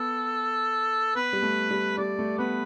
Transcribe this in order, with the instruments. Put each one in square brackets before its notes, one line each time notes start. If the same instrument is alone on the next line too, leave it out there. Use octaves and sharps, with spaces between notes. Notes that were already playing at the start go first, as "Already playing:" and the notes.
Already playing: [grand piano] B3 [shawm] A4
[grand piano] B3 [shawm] B4
[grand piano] G3
A3
G3
[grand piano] G3 [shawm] D5
[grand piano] A3
[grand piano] B3 [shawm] B4